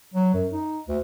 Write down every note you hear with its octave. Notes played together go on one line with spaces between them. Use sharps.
F#3
F#2
D#4
D2